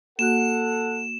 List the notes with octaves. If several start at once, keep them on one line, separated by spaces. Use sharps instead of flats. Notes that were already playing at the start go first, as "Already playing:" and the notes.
A#3 F#4 A4 F#5 F#6 E7